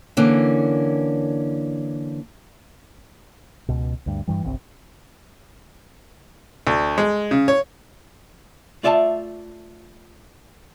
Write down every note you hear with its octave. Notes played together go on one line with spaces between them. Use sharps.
D3 E3 A#3 C#4
C#2 B2
D2 G2
G2 E3 G3
G1 C2 C4
D2
G#3
C#3
C#5
A3 F4 D5 E5 G#5 A5